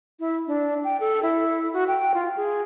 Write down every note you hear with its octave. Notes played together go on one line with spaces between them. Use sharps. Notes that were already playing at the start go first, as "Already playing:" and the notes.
E4
D4
G5
A4
E4
F#4
G5
F4
G#4